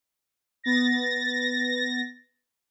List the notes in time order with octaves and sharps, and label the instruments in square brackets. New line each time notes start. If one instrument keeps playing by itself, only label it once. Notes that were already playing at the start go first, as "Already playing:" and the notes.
[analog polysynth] B3 A6 A#6